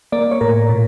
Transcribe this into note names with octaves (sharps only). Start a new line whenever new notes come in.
A#3 D5
C#5
A2 A#4
A#2